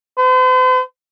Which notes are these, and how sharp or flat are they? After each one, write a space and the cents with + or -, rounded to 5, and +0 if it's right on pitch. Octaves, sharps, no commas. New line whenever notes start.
C5 -45